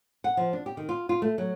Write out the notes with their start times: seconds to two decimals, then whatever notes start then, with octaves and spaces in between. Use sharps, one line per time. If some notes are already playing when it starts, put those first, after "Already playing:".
0.24 F#5
0.37 F3
0.53 D4
0.66 G4
0.77 D#3
0.89 F4
1.09 F4
1.22 A3
1.38 F#3